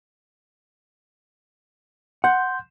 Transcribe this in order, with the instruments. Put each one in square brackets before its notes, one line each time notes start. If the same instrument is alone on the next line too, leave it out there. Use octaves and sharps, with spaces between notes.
[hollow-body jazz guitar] F#5 [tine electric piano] C6 G6